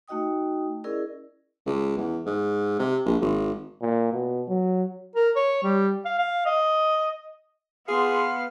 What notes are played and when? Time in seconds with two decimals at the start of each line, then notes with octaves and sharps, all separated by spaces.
0.08 A3 D#4 F#4 D#5 G5 D#6
0.84 C#4 E4 G#4 A#4 D5 D#5
1.66 C#2
1.97 E2
2.26 G#2
2.79 C3
3.05 A#1
3.21 G#1
3.81 A#2
4.12 B2
4.48 F#3
5.15 A#4
5.36 C#5
5.63 G3
6.05 F5
6.18 F5
6.45 D#5
7.88 B3 G#4 F5 C6